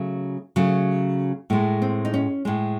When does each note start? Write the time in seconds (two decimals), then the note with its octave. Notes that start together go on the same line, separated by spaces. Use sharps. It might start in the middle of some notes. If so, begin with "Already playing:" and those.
Already playing: C#3 F#3 A3
0.56 C#3 F#3 A3
1.50 A2 G#3 A3
1.82 C4
2.05 D#4
2.14 C#4
2.45 A2 G#3